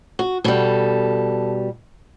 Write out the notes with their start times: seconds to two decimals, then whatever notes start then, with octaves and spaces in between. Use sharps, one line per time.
0.19 F#4
0.44 B2 G3 A4